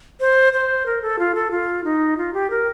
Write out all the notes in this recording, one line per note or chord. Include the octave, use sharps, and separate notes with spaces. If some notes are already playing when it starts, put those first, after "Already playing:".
C5
C5
A#4
A4
F4
A4
F4
D#4
F4
G4
A#4